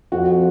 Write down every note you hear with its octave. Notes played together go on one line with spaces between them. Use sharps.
F2 F#4